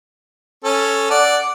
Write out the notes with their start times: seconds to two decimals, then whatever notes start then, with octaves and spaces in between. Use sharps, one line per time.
0.64 C#4 A4
1.11 D5 F#5